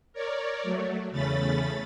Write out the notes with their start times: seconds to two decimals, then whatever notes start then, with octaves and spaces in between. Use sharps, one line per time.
0.13 A#4 C#5 D5
0.63 F#3 A3
1.11 E2 C#3 A3 C#4 B5 A6